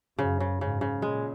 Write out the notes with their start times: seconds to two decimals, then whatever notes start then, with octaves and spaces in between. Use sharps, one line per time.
0.18 F#2 C#3
0.40 C#3
0.61 G#2 C#3
0.81 C#3
1.02 A#2 G#3